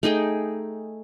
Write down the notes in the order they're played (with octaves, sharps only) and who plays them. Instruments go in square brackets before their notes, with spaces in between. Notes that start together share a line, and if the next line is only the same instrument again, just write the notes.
[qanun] A3 D#4 G#4 G5